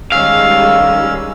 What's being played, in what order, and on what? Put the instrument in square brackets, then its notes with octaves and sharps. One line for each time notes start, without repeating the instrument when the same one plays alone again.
[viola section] D#3 G3 G#3 [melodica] C#4 E6 [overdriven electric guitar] F5